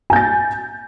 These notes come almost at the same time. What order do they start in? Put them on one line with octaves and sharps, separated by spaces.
G#5 G6 A6